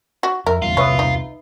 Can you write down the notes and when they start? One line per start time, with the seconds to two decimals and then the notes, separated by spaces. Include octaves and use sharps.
0.23 F#4
0.46 F2 A#4 E5
0.62 G1 E2 G2 F4
0.77 E1 C2 C3 B4 C#5 E5 D#6
0.99 D#4